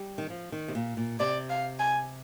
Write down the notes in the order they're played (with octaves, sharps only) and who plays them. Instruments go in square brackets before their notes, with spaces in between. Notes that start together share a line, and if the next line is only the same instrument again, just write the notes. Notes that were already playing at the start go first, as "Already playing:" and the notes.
Already playing: [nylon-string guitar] G3
D#3
F3
D#3
C3
A#2
A#2
[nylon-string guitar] C3 [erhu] D5
[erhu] F5
G#5